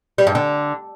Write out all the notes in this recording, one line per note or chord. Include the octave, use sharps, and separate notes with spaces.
G3
G2
D3